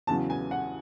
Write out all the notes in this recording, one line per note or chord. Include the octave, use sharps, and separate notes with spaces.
E2 C#3 F#3 A5
G#5
F#5